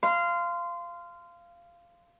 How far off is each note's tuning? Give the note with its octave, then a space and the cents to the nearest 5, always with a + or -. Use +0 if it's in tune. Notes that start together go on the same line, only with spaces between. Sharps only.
F5 -15 C6 -20